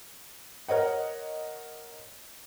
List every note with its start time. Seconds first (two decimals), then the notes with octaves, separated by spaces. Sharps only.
0.68 A#4 C#5 D#5 F#5